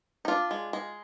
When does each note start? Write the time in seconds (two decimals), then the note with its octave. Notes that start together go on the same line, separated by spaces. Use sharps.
0.25 D#4
0.28 D4 F4
0.51 G#3
0.73 G#3